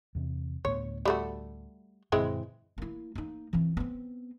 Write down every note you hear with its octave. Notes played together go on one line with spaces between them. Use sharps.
E2 C3
D2 A2 B3 C#5
G3 A3 F#4
F#2 A#2 D3 E3 G#3 C4
A#3 E4
A#3 D#4
E3 C4
B3 C4